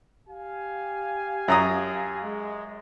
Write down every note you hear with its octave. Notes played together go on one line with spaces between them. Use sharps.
G4 F5 G#5
F#2 A#5 D#6
G#3